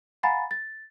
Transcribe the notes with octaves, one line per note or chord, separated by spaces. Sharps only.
F5 F#5 G#5 A#5 B5 A6
A6